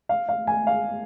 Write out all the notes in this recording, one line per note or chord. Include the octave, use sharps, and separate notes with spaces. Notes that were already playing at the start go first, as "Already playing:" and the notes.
F5
F5
G#5
F5